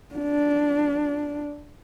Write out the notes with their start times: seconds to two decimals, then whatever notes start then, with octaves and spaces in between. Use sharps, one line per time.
0.15 D4